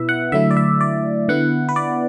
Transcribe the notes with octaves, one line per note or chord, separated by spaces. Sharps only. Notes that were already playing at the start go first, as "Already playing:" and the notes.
Already playing: B2 B3 E4 B4 E5
F#5
D3 F#3 A3 E4 E5
D5
E5
D5
D3 B3 E4 F#5
B4
D5